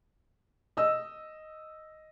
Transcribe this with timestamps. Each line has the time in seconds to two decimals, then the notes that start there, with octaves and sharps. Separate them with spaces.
0.77 D#5 E6